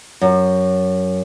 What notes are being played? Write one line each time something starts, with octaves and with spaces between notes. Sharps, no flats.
F#2